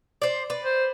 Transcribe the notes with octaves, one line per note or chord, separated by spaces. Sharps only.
C5 D5
B4 D5
C5